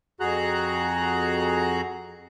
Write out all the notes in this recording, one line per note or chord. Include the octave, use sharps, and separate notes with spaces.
F2 F#4 G#4 A#5 F#6